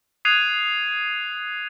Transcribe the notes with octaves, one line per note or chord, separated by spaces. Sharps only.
D#6 F#6 G#6 C7 D#7 F7